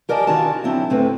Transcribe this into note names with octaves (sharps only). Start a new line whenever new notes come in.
G4 A#4 D5 D#5 G#5 A5
D#3 E3 C#4 F4 F#4 A5
D3 F#3 C4 E4
D2 A2 C4 A4 B4